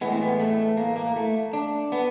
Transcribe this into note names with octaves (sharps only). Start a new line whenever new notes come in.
A2 E3 G#3 B3
C4
B3
A3
A#3
A#3
A3
D4
B3